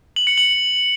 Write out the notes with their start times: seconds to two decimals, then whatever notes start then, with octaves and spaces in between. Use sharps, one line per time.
0.16 F#7
0.27 C#7
0.38 F#7